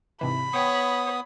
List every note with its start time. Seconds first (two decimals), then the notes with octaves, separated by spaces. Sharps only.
0.21 G#2 C3 E3 B5
0.53 B3 C#5 G5 C#6 D#6